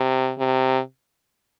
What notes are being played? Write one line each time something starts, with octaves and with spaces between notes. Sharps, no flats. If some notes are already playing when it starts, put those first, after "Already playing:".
Already playing: C3
C3